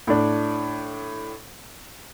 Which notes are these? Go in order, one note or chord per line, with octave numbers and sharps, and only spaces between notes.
A2 D4